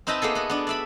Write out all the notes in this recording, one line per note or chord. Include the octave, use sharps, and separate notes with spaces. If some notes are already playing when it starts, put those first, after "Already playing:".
C4 D#4 B4 D#5 E5 A5
A#3 B3 G#4 A4
B3 F#4
B3 D4
D5 E5 B5